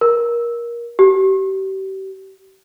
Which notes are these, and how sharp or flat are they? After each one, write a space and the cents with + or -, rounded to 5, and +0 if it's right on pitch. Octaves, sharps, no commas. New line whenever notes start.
A#4 +20
G4 -35